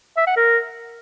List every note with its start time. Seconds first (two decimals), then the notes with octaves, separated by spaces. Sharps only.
0.17 E5
0.27 F#5
0.37 A#4